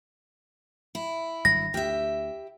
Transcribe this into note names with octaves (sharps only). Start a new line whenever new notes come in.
E4
G#1 G2 F#3 A#6
D2 G4 E5